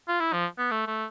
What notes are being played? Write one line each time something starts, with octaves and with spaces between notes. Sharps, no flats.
F4
E4
F3
B3
A3
A3